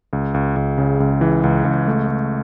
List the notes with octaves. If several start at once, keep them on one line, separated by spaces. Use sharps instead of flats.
C#2
C#2
C#2
C#3
C#2
E3
C#2
C#2
A3
A3